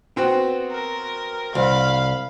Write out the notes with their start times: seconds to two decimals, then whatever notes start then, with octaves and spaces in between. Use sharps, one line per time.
0.16 B3 C4 F#4
0.71 A#4
1.55 C2 F5 B5